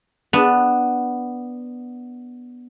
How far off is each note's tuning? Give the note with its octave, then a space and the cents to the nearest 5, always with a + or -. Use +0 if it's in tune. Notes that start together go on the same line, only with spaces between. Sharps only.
B3 +0 D4 +0